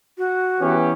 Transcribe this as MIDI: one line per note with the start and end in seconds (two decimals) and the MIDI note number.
0.18 0.74 66
0.61 0.91 52
0.61 0.91 59
0.61 0.93 61
0.61 0.91 67